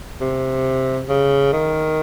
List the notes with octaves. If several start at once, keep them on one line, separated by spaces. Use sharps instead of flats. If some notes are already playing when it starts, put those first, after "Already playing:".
C3
C#3
D#3